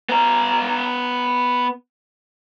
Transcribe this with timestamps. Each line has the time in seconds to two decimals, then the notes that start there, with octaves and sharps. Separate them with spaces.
0.09 B3 A#5